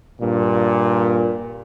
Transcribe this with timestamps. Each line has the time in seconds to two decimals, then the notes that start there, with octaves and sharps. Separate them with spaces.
0.20 G2 A#2